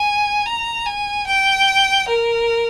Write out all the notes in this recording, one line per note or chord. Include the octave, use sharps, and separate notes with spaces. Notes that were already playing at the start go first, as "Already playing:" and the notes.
Already playing: G#5
A#5
G#5
G5
A#4